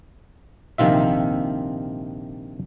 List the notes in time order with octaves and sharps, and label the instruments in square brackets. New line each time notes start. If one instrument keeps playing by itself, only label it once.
[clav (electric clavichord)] A#1 C3 D#3 F4 E5